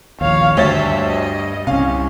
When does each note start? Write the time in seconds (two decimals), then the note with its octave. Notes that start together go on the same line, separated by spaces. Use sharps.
0.21 A#1 D#2 C#5 F5
0.57 D2 G2 C#5 E5 A6
1.08 D#5
1.67 C2 C3 C#4 F5